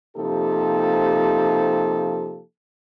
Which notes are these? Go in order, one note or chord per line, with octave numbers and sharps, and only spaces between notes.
C3 F3 A#3 D#4 G4 A4